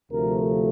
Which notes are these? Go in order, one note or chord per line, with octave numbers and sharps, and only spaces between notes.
D2 C3 F3 A3 A#4